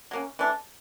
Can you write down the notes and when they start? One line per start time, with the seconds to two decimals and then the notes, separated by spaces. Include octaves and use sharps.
0.11 F#3 A#3 C#4
0.39 E3 A3 D4